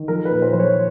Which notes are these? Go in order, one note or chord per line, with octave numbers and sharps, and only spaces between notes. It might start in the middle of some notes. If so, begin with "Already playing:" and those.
Already playing: D#3
F3 A#4
B4
A#2
C5
F3 C5
C#5